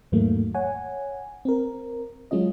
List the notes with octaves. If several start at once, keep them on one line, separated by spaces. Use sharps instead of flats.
E2 G#2 D#3 F#3 A3 A#3
C#5 F#5 G#5
C4 A#4
F#3 G#3 C#4 F4 D#5